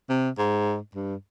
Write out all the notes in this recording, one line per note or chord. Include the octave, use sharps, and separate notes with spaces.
C3
G#2
G2